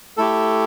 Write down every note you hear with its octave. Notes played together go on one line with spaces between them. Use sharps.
A3 E4 G4 A4